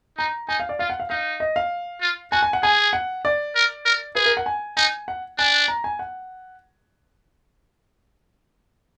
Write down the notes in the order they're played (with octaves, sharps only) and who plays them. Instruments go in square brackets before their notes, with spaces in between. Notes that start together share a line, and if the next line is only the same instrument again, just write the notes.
[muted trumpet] D#4 [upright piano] A#5
[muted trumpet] D#4 [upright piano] G#5
[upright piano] F5
D5
[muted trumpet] F4 [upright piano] F5
[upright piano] F#5
F5
[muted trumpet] D#4 [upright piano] F5
[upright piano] D#5
F5
[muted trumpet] F4
[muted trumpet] F#4 [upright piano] G#5
[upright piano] G#5
F#5
[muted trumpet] G#4 [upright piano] G#5
[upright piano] F#5
D5
[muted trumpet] A#4
A#4
[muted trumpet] G#4 [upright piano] B4
[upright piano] A#4
F#5
G#5
[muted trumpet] D#4 [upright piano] G#5
[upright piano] F#5
[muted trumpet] D4 [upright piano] G#5
[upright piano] A#5
G#5
F#5